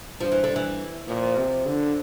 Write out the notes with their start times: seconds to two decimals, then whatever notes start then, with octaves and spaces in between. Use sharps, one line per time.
0.20 G2 F3
0.32 E3
0.44 D3
0.49 G2
0.56 E3
1.08 A#2 F3
1.37 C3
1.66 D3